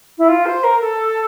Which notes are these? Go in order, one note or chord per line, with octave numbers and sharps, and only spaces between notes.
E4
F4
C5
A#4
A4